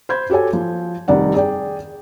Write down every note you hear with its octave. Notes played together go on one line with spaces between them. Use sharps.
C5 B5 G6 G#6
F#4 G4 A4 C#5 G#5
F3
F1 D#3 G3 D5 F#5
G#4 D5 G5